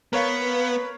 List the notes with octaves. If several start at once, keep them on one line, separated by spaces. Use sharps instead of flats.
B3 A#4 B4 C#5 F5